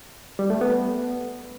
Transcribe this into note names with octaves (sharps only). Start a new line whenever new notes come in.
G3
A3
B3